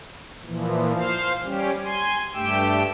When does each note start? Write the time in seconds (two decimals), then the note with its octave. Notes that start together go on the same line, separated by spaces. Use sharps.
0.44 A#2 E3 F3
0.95 C5 F5
1.44 G3 C#4 G4
1.84 G#5 C6
2.34 G2 A3 G4 G5 E6